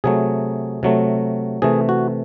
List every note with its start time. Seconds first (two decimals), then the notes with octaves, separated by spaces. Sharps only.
0.04 C3 F#3 A3 G#4
0.83 C3 F#3 A3
1.62 C3 E3 A3 G#4
1.89 F#4